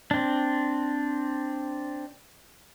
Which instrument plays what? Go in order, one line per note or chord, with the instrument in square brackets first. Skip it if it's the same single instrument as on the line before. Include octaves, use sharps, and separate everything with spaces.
[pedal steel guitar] C4 D4